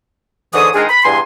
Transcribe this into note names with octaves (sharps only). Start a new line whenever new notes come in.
G#2 D3 E3 C#5 D#6
D#3 G#3 D4 D#4 F4 G#4
B5
E2 G2 G#5 C6